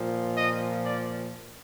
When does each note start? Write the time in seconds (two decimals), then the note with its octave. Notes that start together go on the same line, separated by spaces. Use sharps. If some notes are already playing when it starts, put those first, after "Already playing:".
Already playing: A#2 F3
0.36 D#5
0.85 D5